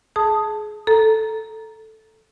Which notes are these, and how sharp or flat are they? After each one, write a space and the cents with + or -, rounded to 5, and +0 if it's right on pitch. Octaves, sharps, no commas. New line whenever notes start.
G#4 +25 A5 +0 D#6 +5
A4 +0 A#5 +0